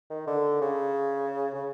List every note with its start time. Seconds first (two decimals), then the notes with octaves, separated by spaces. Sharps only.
0.10 D#3
0.27 D3
0.61 C#3
1.54 C#3